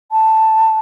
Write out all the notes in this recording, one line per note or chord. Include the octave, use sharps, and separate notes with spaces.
A5